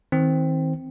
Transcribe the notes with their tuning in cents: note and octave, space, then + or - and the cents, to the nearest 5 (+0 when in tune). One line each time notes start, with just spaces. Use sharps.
D#3 +35 C4 +0